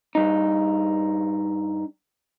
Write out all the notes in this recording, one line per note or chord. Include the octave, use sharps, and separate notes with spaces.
G2 D#4